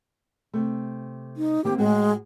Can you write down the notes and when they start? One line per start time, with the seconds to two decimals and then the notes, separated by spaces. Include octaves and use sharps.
0.54 C3 A3
1.37 D#4
1.64 D#3 A#3 C4 G4
1.78 A2 G#3 F#4 G#4